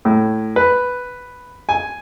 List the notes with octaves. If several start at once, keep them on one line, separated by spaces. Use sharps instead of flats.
A2
B4
G#5